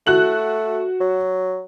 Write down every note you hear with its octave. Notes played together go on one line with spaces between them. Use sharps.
A3 F#4 F#6 F#7
F#3